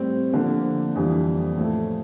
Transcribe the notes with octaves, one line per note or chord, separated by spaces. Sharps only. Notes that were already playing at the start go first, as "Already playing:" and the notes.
Already playing: A2 G3 C4 G4
D3 F3 A#3 D4
F2 E3 G3 A#3 D4
A2 F3 A3